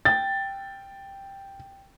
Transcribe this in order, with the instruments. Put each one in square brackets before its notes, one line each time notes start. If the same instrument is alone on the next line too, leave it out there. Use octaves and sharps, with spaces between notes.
[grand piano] G5 [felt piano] A6